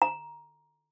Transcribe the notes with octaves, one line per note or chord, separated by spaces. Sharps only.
A#5